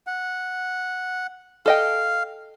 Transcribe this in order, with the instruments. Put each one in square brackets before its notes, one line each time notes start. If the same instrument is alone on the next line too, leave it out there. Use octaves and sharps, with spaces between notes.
[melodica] F#5
[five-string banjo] A4 D#5 G5 [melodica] F5